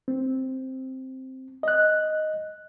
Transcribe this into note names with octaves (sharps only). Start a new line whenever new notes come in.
C4
D#5 F#6